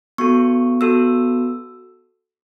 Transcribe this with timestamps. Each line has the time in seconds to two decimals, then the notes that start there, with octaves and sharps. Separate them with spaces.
0.18 B3 F#4 A4 C#6
0.81 B3 F#4 A4 E6